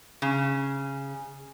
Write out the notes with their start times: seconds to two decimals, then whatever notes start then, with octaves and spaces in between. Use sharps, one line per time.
0.22 C#3